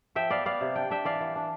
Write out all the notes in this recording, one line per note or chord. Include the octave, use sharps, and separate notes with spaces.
F3 E5 G5
B3 D5 F5
B3 D5 F5
C3
D4 G5
D4 E5 G5
E3 D5 F5
E3
D4